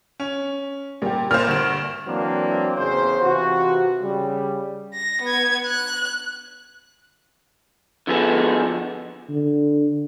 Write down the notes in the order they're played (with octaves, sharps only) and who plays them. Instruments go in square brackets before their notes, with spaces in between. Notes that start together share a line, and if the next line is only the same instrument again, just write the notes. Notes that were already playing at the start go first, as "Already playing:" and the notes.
[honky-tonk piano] C#4
[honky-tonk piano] A#2 [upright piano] G3 G4
[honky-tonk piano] A#2 C5 [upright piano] F6
[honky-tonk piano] D2 G2 E7
[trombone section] E3 F#3 A#3 C4 D4
A1 E2 C#3 C5
C3 E3 F4 F#4
C#3 G3
[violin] A#6
B3 G#6
F#6
[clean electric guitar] D3 F3 B3 G#4 A4
[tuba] D3